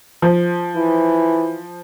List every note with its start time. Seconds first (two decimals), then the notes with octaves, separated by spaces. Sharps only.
0.22 F3
0.76 E3